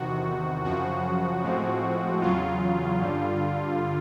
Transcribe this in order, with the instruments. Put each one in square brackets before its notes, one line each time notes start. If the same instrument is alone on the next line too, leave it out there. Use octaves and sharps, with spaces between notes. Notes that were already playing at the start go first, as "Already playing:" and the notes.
Already playing: [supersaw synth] E2 C3 D#3 F#4
F#2 C#3 F3 F#4
A2 F3 G#3 C4
E2 C#3 F#3 F4
G2 D3 G3